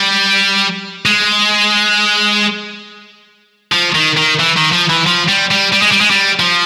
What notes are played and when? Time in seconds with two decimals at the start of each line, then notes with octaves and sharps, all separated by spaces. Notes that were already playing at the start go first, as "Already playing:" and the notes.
Already playing: G3
1.06 G#3
3.72 F3
3.95 D#3
4.17 D#3
4.39 E3
4.57 D#3
4.72 F3
4.89 E3
5.06 F3
5.28 G3
5.51 G3
5.73 G3
5.82 G#3
5.92 G3
6.01 G#3
6.11 G3
6.40 F3